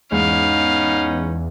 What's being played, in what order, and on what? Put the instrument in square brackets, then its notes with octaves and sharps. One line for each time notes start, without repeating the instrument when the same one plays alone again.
[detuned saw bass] E2 [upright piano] G#2 G#3 [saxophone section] B3 C#4 D#4 [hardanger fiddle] F5